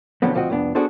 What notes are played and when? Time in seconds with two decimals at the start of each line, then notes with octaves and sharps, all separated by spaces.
0.22 B2 D3 F3 F#3 B3 C4
0.34 D2 F3 A3 C4 F#4 D#5
0.50 C2 F2 B3 D4
0.75 B3 D4 F#4 G#4 A4 C5